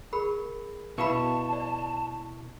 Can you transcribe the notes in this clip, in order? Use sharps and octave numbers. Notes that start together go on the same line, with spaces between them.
G#4 A#4 B5
B2 E4 B4 F5 A5 B5 C#6
D5